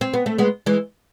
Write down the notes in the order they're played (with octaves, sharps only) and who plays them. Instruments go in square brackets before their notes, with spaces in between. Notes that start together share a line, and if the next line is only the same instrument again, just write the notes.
[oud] C4
B3
A3
G#3 B3
E3 G#3